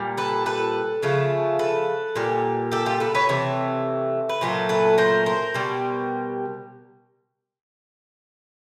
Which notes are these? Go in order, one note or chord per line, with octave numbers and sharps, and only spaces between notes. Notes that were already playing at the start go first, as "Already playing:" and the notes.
Already playing: A#2 G3
A4 B4
A4 B4
C#3 F3 A3
A4 B4
A#2 G3
G4 A4
F4 G4
A4 B4
B4 C#5
C3 E3 A3
B4
A#2 F#3 A3 C5
A4 B4
A#4 C5
A#4 C5
B2 G3